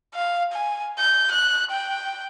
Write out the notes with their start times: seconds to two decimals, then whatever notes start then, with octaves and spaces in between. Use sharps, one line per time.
0.15 F5
0.52 G#5
0.99 G6
1.31 F#6
1.71 G5